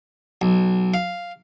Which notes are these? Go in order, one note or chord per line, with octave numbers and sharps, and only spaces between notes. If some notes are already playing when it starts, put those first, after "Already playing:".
B1
F5